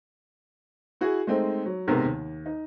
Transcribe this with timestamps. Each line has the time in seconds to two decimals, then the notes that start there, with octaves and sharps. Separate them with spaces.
1.01 E4 F#4 G#4
1.27 G#3 A3 C4 D#4
1.66 F#3
1.88 B1 G#2 C3 G#3 B3 A#4
2.05 D#2
2.46 D#4